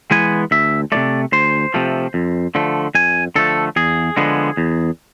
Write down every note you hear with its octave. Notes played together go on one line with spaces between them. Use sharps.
E3 G#3 B3 G#5
D2 E5
C3 F3 A3 D5
D2 C5
C3 F3 A3
F2
D3 F3 A3
F2 G#5
D3 F3 A3 A4
E2 G#4
D3 F3 G#3 B3
E2